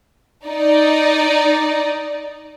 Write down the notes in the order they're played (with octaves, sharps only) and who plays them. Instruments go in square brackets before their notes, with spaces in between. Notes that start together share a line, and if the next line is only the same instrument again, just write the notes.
[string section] D#4 D5